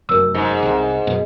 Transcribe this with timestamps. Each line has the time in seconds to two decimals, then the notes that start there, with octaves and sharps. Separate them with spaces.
0.09 F1 F#2 A#4 E6
0.34 G#2
0.63 C2 C3
1.07 F#2 B2